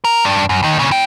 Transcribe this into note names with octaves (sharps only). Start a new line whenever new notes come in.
A#4
G2 D4
F#2
D#2 D#3
A#2 C#3
E4 G5